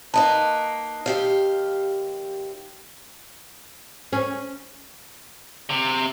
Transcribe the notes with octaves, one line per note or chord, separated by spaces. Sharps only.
A#3 D#4 B4 A5
D#2 G4 F5
C#4
C3